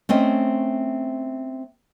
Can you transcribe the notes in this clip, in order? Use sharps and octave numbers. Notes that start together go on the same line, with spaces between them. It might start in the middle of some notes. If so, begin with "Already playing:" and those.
A3 C4 C#4 C5 D#5